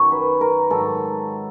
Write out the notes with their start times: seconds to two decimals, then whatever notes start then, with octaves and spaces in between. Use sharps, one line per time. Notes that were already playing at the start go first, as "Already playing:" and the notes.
Already playing: F#2 D#3 F#3 C#5
0.12 B4
0.41 A#4
0.70 G#2 D#3 F#3 A4